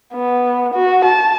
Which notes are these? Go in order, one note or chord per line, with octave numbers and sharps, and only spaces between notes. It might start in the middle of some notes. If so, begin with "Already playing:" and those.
B3
F#4
A5